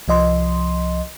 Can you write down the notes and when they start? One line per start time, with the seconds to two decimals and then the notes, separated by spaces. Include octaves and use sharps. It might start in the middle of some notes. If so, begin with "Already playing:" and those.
0.08 C2 F3 D#5 C6